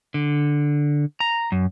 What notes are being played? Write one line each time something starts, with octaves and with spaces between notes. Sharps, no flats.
D3
A#5
F#2